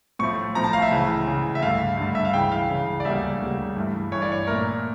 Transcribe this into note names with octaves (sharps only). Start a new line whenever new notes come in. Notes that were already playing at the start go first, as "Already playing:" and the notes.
A2 F3 A3 C#6
A2 F3 A3 A#5
A5
F5
E5
C#2 C#3 E3
C#2 C#3 E3
E5
G2 D3 A3 F5
G2 D3 A3
E5
F5
C#2 C#3 E3 G5
F5
C#2 C#3 E3
D5
D2 C#3 G3 A#3 E5
D2 C#3 G3 A#3
G2 E3 A3
G2 E3 A3 C#5
D5
C#5
A#2 A3 A#4